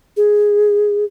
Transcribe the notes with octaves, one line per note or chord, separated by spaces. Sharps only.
G#4